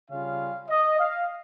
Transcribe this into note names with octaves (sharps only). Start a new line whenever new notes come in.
C#3 G3 C#4 F4 F5
D#5
F5